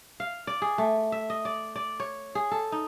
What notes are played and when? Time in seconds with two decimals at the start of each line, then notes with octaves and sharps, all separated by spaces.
0.20 F5
0.47 D5
0.62 G#4
0.78 A3
1.12 E5
1.30 D#5
1.45 D5
1.76 D5
2.00 C#5
2.35 G#4
2.52 A4
2.72 D#4